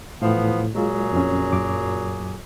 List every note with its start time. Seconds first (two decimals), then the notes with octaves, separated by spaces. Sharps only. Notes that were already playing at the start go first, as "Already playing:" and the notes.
0.22 A2 E3 F3 B3
0.75 A#2 F#3 G#3 F4 G#4
1.13 F2 C#4
1.53 F#2 D6